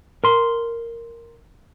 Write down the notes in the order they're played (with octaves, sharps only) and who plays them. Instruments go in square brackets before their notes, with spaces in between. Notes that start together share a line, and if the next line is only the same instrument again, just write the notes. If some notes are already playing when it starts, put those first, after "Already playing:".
[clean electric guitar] A#4 C6